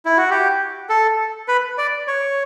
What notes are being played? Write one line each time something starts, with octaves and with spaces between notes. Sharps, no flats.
E4
F#4
G4
A4
B4
D5
C#5